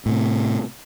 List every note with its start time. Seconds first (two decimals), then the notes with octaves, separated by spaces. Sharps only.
0.06 A2 C3